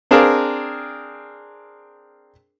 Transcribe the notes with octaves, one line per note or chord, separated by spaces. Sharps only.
C4 D4 G#4 A#4 F5